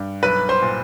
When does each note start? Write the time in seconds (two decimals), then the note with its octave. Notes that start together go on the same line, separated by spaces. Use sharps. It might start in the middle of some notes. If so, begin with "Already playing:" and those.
Already playing: G2
0.23 B1 B4 B5
0.49 C5 C6
0.62 A#2